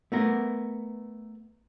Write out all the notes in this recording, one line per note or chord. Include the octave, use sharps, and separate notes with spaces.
A3 B3 A#4